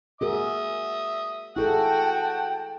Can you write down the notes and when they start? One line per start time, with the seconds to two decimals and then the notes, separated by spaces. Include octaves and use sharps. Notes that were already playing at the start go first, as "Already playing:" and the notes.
0.21 F#4 G#4 A#4 E5 D#6
1.56 E4 F#4 G#4 A4 F#5 G5 A5